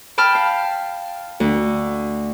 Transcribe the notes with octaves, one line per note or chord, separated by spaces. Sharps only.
G5 A5 B5 F6
F5
D2